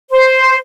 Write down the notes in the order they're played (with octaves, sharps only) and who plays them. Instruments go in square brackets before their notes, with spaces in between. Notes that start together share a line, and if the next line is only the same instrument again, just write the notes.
[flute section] C5